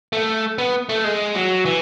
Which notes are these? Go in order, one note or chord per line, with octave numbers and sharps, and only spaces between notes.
A3
B3
A3
G#3
F#3
E3